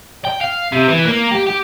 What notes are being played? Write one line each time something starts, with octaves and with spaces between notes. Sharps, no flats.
G5
F5
C3
E3
A#3
G4
G4